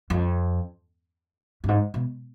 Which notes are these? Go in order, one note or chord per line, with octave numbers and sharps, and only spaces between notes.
F2
G2
G#2
B2